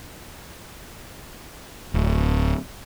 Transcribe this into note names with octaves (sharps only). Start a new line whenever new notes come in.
D1